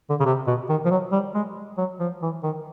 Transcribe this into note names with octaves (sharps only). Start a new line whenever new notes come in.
D3
C#3
C3
B2
D#3
F3
F#3
G3
G#3
F#3
F3
E3
D#3